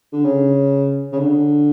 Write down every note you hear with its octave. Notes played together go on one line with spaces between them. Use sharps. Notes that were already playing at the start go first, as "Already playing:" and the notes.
D3
C#3
C#3
D3